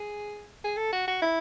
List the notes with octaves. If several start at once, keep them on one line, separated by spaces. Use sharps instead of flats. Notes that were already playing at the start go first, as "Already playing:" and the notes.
Already playing: G#4
G#4
A4
F#4
F#4
E4